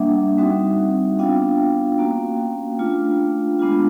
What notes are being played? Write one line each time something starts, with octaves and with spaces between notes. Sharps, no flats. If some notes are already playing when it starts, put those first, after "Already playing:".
Already playing: G3 A#3 D4 E5 F#5
G3 C4 D#4 F#4
B3 D4 F4 F5 G5
A#3 C#4 F#4
A3 D4 F4
G#3 B3 D4 F4